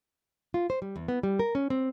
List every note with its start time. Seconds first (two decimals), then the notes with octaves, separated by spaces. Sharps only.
0.54 F4
0.70 C5
0.82 G3
0.96 E2
1.08 B3
1.23 G3
1.39 A#4
1.55 C#4
1.70 C4